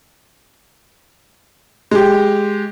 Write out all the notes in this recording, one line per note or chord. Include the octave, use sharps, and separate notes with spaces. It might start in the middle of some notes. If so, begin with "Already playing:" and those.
G#3 G4